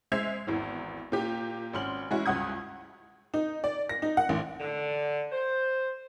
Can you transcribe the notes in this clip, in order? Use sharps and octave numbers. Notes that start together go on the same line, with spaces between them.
G#3 C5 E5 G#6 C7 F7
G#1 E2 E3
A#2 G4
G#1 C#4 C6 F6 F#7
E3 G#3 C#4 E4 F#4
C#2 G2 F#5 D#6 G#6
D#4
D5
A#6
D#4
F#5
A1
D3
C5